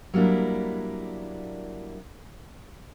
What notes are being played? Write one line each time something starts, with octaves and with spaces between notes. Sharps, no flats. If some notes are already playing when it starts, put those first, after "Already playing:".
F#3 G3 A#3 D4 E4